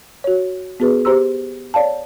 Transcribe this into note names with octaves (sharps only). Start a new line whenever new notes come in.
F#4 C#5
B3 F#4 G#4 B4
G4 C5 A#5 C6 E6
C#5 D5 F5 A5